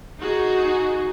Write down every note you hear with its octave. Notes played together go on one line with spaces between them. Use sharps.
D#4 F#4 G#4